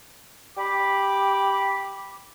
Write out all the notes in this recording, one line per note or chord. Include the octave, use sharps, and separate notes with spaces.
G4 B5 D6